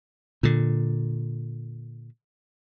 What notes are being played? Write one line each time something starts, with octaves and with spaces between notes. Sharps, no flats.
A#2 D3